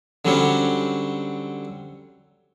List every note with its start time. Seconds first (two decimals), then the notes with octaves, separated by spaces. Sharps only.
0.25 D3 F#3 G3 C4 C#4